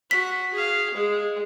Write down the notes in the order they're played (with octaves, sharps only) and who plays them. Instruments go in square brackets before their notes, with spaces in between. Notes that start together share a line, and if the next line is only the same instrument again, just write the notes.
[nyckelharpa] F#4 [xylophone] B6
[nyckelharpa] G#4 F5
G#3 G#4